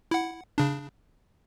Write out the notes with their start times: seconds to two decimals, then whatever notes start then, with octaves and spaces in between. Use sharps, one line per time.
0.11 E4 F#5
0.58 C#3 D4